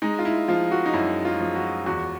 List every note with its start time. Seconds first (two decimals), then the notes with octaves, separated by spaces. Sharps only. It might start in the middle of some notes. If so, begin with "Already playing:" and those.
0.02 G#3 D#4
0.19 F4
0.25 E4
0.48 F3 F4
0.71 F#4
0.86 D#4
0.94 F#2 E4
1.25 F4
1.40 F3
1.56 F#4
1.86 E2 F#4